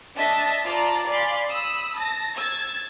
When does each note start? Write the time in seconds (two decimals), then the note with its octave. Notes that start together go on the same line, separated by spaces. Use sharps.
0.17 D4 D#5 E5 A5
0.63 F4 D5 A5 A#5
1.07 D5 F5 G#5 B5 C6
1.49 B5 D#6 E6
1.97 A5 A#6
2.37 E6 G#6 A6